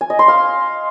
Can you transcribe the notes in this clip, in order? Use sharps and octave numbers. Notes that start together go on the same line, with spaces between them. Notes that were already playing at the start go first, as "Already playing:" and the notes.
G#5
D#5
C6
F5